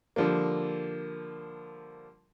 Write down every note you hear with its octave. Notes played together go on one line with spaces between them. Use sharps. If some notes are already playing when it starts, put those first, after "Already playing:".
D3 F3 G3 A#3